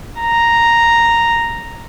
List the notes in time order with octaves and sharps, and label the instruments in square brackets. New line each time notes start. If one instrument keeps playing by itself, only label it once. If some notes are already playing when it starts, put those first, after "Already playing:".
[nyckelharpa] A#5